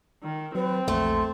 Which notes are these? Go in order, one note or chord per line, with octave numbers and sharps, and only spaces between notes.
D#3
F#3 C4 B4
A#1 E2 A#2 A3 C6